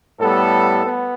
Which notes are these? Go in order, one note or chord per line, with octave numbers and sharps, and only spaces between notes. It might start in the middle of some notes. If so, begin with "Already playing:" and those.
A2 G3 B3 A4
B3